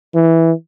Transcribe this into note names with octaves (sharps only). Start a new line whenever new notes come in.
E3